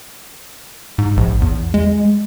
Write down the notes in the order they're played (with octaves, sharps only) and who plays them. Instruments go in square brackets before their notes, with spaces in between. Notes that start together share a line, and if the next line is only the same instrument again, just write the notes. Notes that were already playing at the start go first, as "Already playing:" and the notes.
[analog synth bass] G#2
A#1
E2
G#3